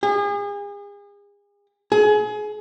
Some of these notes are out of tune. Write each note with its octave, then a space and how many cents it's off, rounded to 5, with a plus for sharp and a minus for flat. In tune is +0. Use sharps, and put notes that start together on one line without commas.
G#4 -40
G#4 +25